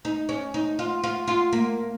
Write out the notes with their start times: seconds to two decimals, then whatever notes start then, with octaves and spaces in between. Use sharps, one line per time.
0.05 D#4
0.29 C#4
0.54 D#4
0.79 F4
1.04 F4
1.28 F4
1.53 A#3